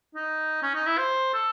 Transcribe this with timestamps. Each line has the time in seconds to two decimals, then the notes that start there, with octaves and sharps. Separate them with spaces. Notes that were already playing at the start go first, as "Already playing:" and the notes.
0.15 D#4
0.63 C#4
0.75 D#4
0.87 E4
0.98 C5
1.34 A4